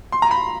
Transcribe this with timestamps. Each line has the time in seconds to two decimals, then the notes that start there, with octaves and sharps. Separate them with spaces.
0.12 C6
0.22 A#5
0.31 B5